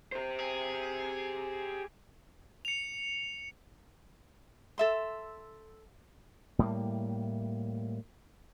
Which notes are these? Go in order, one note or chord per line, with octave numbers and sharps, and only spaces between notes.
G4 C5
G#4
C#7 F7
A4 E5 C6
A2 G3 G#3 A#3